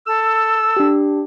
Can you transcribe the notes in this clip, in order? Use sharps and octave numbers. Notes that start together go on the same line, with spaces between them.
A4 E6
D4 G4